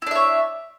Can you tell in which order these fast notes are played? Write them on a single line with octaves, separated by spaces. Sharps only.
E4 D4 E5 C#5